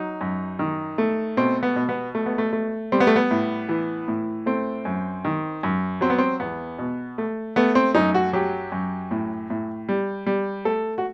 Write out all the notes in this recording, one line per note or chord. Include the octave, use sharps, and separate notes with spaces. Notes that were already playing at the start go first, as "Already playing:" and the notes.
Already playing: F#3 D#4
F#2
D#3
A3
B2 C4
B3
B2
B3
A3
B3
A3
A3
G3 C4
B3
A3
B3
A2
E3
A2
A3 C4
F#2
D#3
F#2
F#3 C4
B3
C4
E2 B3
B2
A3
A3 B3
C4
F#2 D#4
F#4
F#3 G4
F#2
A2
A2
G3
G3
A3 A4
F#4